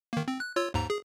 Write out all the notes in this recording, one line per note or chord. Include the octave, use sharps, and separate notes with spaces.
D#3 A#3
C4
F#6
F4 C#5 E6
D#2 G#2 A#5
G#4